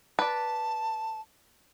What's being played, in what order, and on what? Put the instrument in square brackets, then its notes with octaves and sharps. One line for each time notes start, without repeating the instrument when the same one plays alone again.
[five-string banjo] B4 D5 [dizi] A5